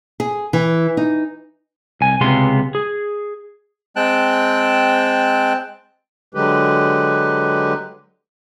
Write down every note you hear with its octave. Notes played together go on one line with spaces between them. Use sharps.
G#4
E3
D#4
C2 G#5
C#2 C3 G#3 B3 F5 C6
G#4
G#3 C4 G5 A5 F#6
D3 F#3 G#3 G4 B4